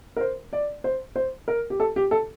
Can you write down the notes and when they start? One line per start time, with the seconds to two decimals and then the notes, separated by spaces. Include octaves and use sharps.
0.16 A#4
0.20 C5
0.53 D5
0.84 C5
1.16 C5
1.48 A#4
1.70 G4
1.80 A4
1.96 G4
2.11 A4